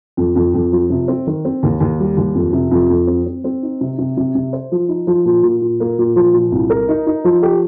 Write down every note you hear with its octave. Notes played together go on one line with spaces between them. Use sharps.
F2
F2
F2
F3
C3
C4
D#3
C4
D#2
D#2
G3
D#2
F2
C3
F2
F2
C4
C4
C4
D#4
C3
C3
C3
C3
C5
F3
D#4
F3
A#2
A#2
A#2
A#3
A#2
F3
A#2
C2
A#4
D#4
D#4
F3
G4